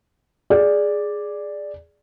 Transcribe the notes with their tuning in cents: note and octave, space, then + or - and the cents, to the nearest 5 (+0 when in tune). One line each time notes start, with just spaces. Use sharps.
G#4 +0 D5 +0